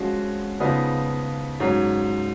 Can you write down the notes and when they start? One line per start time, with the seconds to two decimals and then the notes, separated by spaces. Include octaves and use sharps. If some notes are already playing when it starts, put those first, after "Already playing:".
Already playing: F3 G#3 C#4 F#4
0.60 C#3 F3 B3 D#4
1.60 G#2 F#3 C#4